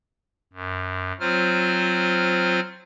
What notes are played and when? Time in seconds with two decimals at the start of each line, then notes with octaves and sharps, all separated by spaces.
0.53 F#2
1.20 F#3 C4 F4 C5 F6